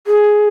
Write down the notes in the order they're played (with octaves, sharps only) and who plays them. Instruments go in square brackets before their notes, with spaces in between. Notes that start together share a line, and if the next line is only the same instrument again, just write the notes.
[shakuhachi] G#4